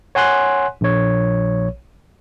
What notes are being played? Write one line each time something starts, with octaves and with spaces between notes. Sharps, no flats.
C#5 F#5 G#5 C6 F#6
A#1 C#5